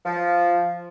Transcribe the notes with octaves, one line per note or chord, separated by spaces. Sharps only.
F3